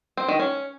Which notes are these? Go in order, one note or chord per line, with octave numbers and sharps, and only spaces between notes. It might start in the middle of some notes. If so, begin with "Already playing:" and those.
C4
D#3
C#4